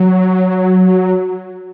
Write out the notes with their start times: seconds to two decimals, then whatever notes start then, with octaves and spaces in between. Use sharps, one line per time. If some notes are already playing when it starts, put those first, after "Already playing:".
Already playing: F#3